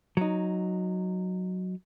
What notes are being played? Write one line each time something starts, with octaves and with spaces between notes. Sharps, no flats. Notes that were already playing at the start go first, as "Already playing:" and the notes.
F#3 D#4